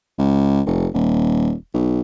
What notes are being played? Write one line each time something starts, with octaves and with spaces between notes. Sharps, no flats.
C#2
F1
D#1
B1